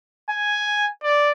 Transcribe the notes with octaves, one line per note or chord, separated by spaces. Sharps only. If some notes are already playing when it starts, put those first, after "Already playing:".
G#5
D5